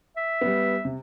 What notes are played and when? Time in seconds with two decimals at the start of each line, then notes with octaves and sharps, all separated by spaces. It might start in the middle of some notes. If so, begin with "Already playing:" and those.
0.17 E5
0.41 G3 B3
0.85 C3